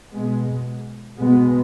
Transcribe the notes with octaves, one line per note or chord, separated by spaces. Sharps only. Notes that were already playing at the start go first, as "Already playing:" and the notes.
B2 G#3 B3
B2 G#3 B3